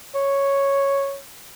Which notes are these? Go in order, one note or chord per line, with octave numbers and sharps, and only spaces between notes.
C#5